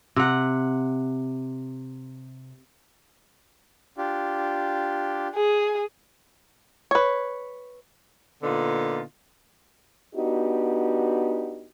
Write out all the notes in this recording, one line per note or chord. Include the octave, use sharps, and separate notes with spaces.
C3 F#5
D4 F4 G4
G#4
B4 C#5
A#2 D3 B3 D#4 F4
B3 D4 D#4 F#4 G4